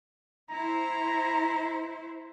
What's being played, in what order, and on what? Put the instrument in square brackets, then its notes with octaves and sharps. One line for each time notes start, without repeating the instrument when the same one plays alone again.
[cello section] E4 C5 [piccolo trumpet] A#5